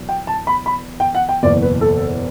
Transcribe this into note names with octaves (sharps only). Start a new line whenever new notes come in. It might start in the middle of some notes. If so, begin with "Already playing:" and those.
Already playing: E2 B2 F#3
G5
A5
B5
B5
G5
F#5
G5
F#1 E2 B2 D5
B4
A4